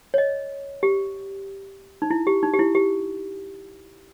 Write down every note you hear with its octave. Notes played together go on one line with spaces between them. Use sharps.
C#5
D#5
G4
D#4
E4
G4
D#4
G4
E4
G4